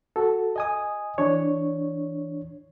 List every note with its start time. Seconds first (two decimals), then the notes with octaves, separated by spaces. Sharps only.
0.16 F#4 A4
0.56 D#5 G#5 D#6
1.18 E3 D4 C#5